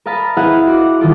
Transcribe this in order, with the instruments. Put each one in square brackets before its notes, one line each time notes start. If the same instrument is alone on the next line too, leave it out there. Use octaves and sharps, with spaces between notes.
[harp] A#4 D#5 F5 A5 B5
E4 G#4 B4 D#5 F5 F#5
F#4 C6 D6
D#1 D#3 F4 A4 D6